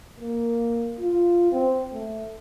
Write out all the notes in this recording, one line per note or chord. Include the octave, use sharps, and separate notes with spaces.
A#3
F4
C4
A3